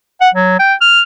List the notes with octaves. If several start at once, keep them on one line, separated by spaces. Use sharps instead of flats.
F#5
F#3
G5
F6